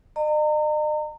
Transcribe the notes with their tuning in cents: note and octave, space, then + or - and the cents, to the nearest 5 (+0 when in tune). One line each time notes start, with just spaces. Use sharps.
D#5 -45 A#5 -35